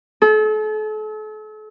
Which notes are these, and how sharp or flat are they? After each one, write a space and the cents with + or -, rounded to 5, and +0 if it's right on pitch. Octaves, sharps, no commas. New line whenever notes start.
A4 -40